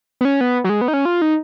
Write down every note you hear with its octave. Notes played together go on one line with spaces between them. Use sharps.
B3
C#4
B3
F#3
G#3
B3
D#4
C#4
F4
D#4